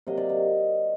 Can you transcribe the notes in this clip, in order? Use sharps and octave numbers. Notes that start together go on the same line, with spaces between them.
C3 F#3 A#3 D#5
D5
D#5